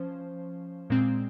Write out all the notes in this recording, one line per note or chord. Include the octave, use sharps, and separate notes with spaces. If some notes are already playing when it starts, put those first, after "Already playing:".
Already playing: F3 C#4 C5
A#2 G#3 C4